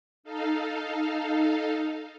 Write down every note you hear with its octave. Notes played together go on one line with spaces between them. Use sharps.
D#4 A4 F5